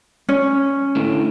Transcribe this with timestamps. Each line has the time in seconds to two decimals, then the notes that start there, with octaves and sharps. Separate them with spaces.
0.29 C#4
0.96 A2 D3